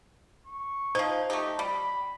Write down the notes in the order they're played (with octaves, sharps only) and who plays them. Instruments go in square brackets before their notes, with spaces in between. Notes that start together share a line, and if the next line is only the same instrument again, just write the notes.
[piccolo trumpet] C#6
[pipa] F3 D#4 [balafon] C5
[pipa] A3 D#4 [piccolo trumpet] G4
[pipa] G3 [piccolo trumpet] B5